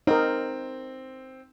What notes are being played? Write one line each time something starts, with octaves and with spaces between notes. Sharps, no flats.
C4 D#4 A#4